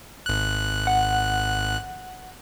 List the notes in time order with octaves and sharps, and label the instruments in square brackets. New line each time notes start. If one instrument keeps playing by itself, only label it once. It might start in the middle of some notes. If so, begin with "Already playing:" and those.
[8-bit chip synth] G#1 F#6
[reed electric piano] F#5